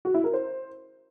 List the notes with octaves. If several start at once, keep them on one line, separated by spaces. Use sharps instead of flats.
F#4
E4
A#4
C5